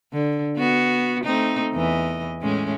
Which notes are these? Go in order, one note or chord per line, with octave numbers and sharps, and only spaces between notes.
D3
B3 F#4
A3 C4 D#4
E2 E3 D#5
A2 G#3 C#4